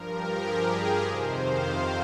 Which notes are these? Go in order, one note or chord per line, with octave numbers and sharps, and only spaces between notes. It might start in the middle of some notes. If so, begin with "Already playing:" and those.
Already playing: G2 F3 A#4
G4
G#4
A#4
F2 C3 D#3 C5
F5
F5